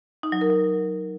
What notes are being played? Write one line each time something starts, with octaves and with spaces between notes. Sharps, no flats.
D#4
F#3
A#4
F#3